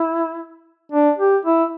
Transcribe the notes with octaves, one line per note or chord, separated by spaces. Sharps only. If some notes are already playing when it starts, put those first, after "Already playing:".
Already playing: E4
D4
G4
E4